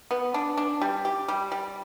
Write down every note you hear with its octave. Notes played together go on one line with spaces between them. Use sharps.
B3
D4
D4
G3
G4
G3
G3